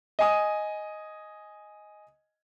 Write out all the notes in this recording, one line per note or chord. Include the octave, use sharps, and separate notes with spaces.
D#5 G#5 D#6